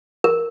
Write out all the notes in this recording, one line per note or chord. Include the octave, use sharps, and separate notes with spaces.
A#4